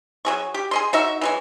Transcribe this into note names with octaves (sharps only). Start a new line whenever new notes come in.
F#3 G#4 C#6
G4
G#4 D#5 C6
D#4 F#4 E5
E3 F#3 G#3